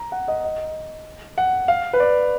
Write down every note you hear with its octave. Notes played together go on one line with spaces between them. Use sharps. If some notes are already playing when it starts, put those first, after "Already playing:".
Already playing: A#5
F#5
D#5
D#5
F#5
F5
B4
D5